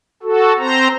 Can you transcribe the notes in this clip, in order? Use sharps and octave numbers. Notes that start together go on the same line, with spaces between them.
F#4 A4
C4 C5 A#5